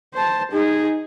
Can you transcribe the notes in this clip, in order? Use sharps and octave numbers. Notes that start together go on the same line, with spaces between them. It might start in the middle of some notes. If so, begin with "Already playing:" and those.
C5 A5
D#4 G#4